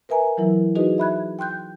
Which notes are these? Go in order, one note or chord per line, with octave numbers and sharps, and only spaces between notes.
A#4 B4 E5 G#5 A#5
E3 F#3 E4 A#4
D#4 F#4 G#4 B4 D#5
E5 B5 F#6 G#6
G5 C6 F#6 G6